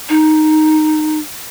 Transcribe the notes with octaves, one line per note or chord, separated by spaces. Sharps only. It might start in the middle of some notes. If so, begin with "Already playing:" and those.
D#4